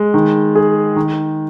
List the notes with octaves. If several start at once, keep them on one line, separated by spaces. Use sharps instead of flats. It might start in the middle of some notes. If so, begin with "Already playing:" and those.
Already playing: G#3
D#3
G#4
D#3